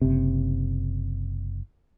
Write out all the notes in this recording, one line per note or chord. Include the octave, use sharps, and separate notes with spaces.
F#1 C3